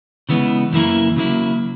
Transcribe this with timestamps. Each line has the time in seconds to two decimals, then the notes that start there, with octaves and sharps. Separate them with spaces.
0.29 C#3 E3 G#3 B3
0.72 F#2 C#3 E3 A#3 E4
1.16 C#3 F#3 A#3 E4